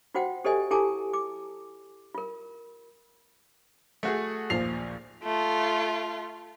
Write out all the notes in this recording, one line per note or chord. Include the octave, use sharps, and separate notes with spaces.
F4 F#4 C5 F#5 G5
G4 A4 C5 D5 D#5 G#5
E4 G4 A4 G#5 A5 D6
D6
F4 A#4
A3 F#4 G#4
A#1 D#2 F3 C7 F7
A3 F4